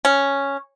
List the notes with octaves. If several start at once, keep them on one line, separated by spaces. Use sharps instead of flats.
C#4